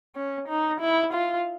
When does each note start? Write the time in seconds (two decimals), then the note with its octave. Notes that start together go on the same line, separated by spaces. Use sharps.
0.15 C#4
0.48 D#4
0.81 E4
1.14 F4